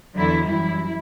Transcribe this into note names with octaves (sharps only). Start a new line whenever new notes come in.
E2 D3 F#3 E4
F#2 E3 G3 E4